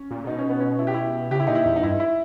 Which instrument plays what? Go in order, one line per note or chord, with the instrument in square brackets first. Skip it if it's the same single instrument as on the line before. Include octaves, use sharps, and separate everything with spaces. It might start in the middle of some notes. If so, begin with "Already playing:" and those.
Already playing: [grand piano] C#4
[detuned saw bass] A#2
C#3
[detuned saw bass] B2 [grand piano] D#4
[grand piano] C#4
B3
C#4
E4
G4
E4
[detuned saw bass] C#3 [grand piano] G4
[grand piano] E4
[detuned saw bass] A#2 [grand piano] D#4
[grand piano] E4
[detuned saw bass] E2
[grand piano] D#4
[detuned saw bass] G2 [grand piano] E4
[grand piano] E4